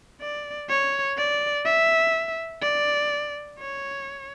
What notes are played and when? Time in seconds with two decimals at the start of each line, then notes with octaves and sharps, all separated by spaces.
0.21 D5
0.69 C#5
1.17 D5
1.65 E5
2.62 D5
3.59 C#5